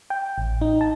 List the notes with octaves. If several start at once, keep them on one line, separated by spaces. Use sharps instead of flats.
G5
A1
D#4
A5